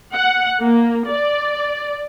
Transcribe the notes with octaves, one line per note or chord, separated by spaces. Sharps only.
F#5
A#3
D5